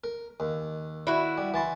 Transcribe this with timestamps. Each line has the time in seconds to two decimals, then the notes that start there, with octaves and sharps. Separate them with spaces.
0.04 A#4
0.40 D#2
1.07 E4 F#4
1.38 G3
1.54 E3 A5 C6